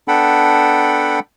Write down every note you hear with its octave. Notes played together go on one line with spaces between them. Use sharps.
B3 D4 A4 F#5 G5 B5